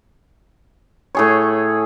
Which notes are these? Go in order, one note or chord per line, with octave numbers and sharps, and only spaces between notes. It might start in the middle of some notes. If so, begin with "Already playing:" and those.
A2 G#4 C#5